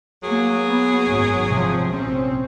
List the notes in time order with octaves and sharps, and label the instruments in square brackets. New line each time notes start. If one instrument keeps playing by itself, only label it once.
[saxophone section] F#3 G#4 [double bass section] A#3
[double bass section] B3
G#1 F#2
C3 F3
A#1 C4 C#4